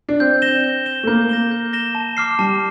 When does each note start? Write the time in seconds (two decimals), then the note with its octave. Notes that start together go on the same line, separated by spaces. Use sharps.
0.09 D4
0.20 C4 G6
0.42 A#6 E7 G7
0.64 G6
0.86 A#6 E7 G7
1.03 A3
1.07 A#3 G6
1.29 A#6 E7 G7
1.51 G6
1.73 A#6 E7 G7
1.95 A5
2.17 D6 F6 C7
2.39 G3 A5